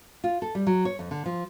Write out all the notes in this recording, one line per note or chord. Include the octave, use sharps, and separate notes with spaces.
F4
A4
G3
F#3
C#5
F2
D3
F3